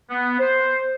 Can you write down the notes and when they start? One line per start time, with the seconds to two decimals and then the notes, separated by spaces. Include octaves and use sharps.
0.10 B3
0.40 C5